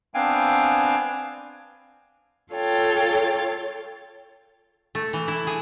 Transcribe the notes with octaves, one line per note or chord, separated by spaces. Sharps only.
B3 C4 D4 F5 G5 G#5
F4 A4 C#5 G5 A6
A3
E3
E4
G#4